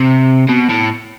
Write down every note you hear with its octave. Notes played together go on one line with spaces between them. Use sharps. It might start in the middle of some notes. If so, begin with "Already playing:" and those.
Already playing: C3
B2
A2